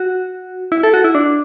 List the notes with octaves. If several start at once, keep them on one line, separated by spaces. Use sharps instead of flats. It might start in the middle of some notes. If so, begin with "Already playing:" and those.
Already playing: F#4
E4
A4
F#4
E4
D4